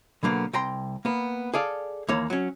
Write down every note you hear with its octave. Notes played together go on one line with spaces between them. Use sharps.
B2 D3 F#3 A#3 B3
C2 G5 A#5 C6
A#3 B3
G#4 A4 D5 F5
D#2 E3 A#3 C#5
F#3 C#4